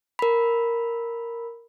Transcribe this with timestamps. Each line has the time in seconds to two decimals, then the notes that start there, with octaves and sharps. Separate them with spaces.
0.19 A#4 B5